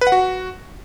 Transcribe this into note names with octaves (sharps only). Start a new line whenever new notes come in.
B4
F#5
F#4